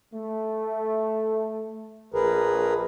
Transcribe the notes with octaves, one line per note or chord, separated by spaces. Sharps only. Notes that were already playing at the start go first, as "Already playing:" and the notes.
A3
A#1 G#4 A#4 B4